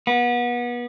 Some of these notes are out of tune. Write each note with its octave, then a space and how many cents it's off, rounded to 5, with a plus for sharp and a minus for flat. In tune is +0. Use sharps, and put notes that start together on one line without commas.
B3 -30